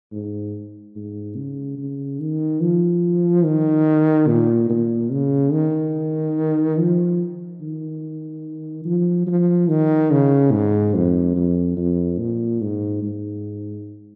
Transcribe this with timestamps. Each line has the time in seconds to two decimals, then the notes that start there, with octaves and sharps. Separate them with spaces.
0.12 G#2
0.96 G#2
1.36 C#3
1.78 C#3
2.20 D#3
2.61 F3
3.45 D#3
4.28 A#2
4.70 A#2
5.12 C#3
5.53 D#3
6.78 F3
7.61 D#3
8.86 F3
9.27 F3
9.69 D#3
10.12 C#3
10.52 G#2
10.95 F2
11.36 F2
11.77 F2
12.19 A#2
12.61 G#2
13.03 G#2